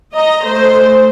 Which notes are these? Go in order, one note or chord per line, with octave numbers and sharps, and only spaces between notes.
D#5 A#5
A3 C5